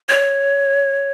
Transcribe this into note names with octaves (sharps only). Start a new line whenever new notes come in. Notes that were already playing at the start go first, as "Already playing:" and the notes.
C#5